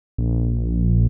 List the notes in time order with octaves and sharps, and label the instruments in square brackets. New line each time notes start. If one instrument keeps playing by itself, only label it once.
[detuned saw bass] A#1